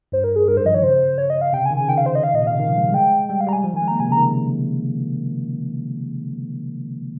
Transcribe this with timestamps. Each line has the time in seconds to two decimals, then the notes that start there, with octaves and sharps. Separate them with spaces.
0.12 G2 C5
0.24 A#4
0.36 G#4
0.48 G2 A#4
0.57 G#2 C5
0.65 F3 D#5
0.74 D#3 C#5
0.83 C#3 C5
1.18 C#5
1.30 D#5
1.41 F5
1.53 C3 G5
1.62 C#3
1.66 G#5
1.71 D#3
1.77 C#3 G#5
1.89 D#3 G5
1.98 F5
2.06 C5
2.15 D#5
2.23 F5
2.34 A#2 D#5
2.42 C3
2.47 C#3 F5
2.59 D#3
2.68 F3
2.77 G#3
2.85 G3
2.94 G#3 G5
3.29 G3 G5
3.41 F5
3.47 G3 A#5
3.53 G#5
3.64 F3
3.73 D#3 G#5
3.82 G#3
3.88 A#3 A#5
4.00 C3 G#5
4.09 C#3
4.12 A#5
4.18 D#3